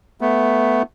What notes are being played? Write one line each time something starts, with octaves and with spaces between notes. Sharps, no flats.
A3 B3